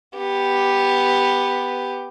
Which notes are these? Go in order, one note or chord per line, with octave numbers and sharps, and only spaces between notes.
B3 G4